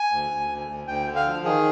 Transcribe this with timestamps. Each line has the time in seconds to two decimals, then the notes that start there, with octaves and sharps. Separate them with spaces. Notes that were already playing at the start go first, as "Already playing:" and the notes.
Already playing: G#5
0.12 D2
0.30 D2
0.50 D2
0.69 D2
0.87 D2 G5
1.06 D3
1.15 F5
1.26 F3
1.44 D#3 G#4